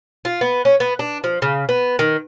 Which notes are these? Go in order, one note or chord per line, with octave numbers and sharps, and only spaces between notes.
F4
B3
C#4
B3
D4
F3
C#3
B3
D#3